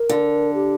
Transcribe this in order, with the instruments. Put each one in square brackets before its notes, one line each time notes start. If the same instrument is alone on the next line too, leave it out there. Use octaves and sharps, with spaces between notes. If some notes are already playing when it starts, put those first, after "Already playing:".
Already playing: [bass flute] A#4
[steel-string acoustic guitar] D3
[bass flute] G4